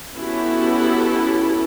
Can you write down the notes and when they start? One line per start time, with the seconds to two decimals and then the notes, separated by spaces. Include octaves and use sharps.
0.15 B3 C#4 E4 F#4 G4 A4